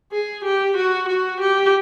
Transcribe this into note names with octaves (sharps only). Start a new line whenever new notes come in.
G#4
G4
F#4
F#4
G4